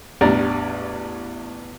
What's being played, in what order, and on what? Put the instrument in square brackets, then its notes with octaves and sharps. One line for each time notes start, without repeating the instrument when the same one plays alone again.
[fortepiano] A1 E2 G3 D4 D5 A#5